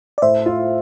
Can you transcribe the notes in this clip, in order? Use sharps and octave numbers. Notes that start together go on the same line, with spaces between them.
D5
A2 C5 E5
F4